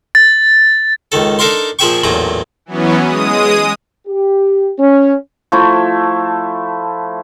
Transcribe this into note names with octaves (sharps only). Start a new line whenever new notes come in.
A6
C#2 D#3 A4
D4 D#4 A4 A#4 F5 C6
A#2 F3 G#4 E5 G5 C#6
A1 E2 A#2 F#3 A#5
E3 F#3 B3 C#4
G#3 D#6
G4
C#4
F3 A3 E4